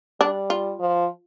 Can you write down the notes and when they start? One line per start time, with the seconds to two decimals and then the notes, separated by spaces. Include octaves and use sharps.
0.20 G3 D4
0.50 F4
0.79 F3